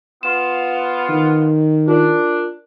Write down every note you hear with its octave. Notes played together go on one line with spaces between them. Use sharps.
B3 F4 E7
D#3
D4 F4 A#4